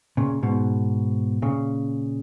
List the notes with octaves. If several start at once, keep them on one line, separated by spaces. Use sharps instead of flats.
A#2 C#3
G#2 B2
A#2 C#3